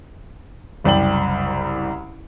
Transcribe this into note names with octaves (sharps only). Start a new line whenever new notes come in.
F#1 C2 D5 G5 F#7